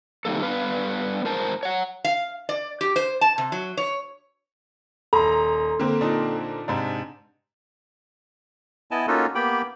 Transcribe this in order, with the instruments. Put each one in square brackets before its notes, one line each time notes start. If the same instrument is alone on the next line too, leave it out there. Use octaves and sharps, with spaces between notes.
[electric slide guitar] C3 D#3 G3 A#3 A4
G2 B3 B4 F5
G#2 A#4 C5 A5
C#5 F#5
[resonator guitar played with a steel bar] F5
D5
G4
C5
A5
C3
F#3
C#5
[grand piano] D#1 [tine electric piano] A4 C6 [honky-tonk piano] A#5
[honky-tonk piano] D3 A#3 C4
[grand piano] A#2 D4 D#4
G#2 C3 D4
[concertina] B3 E4 D#5 G#5 A5
A#3 C#4 D#4 F4 F#4 A4
A#3 B3 G4 G5 B5